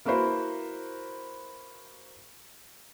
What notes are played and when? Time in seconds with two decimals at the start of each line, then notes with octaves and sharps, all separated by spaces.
0.05 A#3 E4 F#4 B4 C5